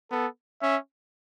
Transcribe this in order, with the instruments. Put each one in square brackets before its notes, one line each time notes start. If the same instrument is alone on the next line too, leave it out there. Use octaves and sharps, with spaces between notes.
[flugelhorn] B3 [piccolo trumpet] A4
[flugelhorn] C#4 [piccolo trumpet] E5